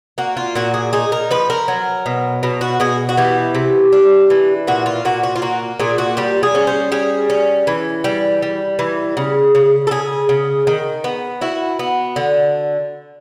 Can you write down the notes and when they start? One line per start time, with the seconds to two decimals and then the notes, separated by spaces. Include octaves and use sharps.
0.18 A#3 F#4
0.37 F4
0.55 A#2 F#4
0.74 G#4
0.93 D#4 G#4
1.12 A#4
1.31 F3 B4
1.50 A#4
1.68 F#3
2.06 B2
2.43 B2
2.61 F#4
2.80 B2 G#4
3.09 F#4
3.17 E3 G4
3.55 C3
3.93 D4
4.30 E3
4.67 A#2 F#4
4.86 F4
5.05 A#2 F#4
5.23 F#4
5.36 F4
5.42 A#3 F#4
5.79 A#2 G#4
5.98 F#4
6.17 G3 G4
6.43 G#4
6.55 C#4
6.67 C5
6.92 G3 G#4
7.30 C#4
7.67 E3
8.04 G3
8.42 G3
8.79 E3
9.17 C#3
9.55 C#3
9.87 A4
9.91 C#3 G#4
10.29 C#3
10.67 D#3
11.04 B3
11.41 E4 F#4
11.79 B3
12.16 D3